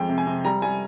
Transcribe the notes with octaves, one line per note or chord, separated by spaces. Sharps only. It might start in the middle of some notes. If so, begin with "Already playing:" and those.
Already playing: F2 G#3 G5
C3
G#5
C3
G3 A#5
G3 G#5